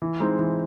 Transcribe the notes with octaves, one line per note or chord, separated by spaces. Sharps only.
E3
G#3 C4 D#4
E3